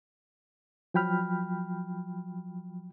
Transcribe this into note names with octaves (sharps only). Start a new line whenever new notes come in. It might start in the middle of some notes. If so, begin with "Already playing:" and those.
F3 F#3 G5 B5 F6